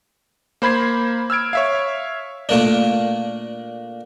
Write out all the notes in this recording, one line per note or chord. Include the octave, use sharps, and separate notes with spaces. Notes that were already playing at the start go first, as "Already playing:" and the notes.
A#3 C5 B5 G#6 C7
E6 F6 G#6 D7
C#5 E5 F5
A#2 A3 A#3 D4